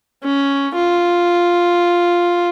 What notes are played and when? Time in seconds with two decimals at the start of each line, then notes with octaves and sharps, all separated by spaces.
0.23 C#4
0.75 F4